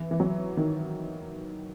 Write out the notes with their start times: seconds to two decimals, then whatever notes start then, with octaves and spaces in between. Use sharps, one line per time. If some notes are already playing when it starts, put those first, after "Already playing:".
Already playing: E3
0.11 E3
0.20 F#3
0.57 D#3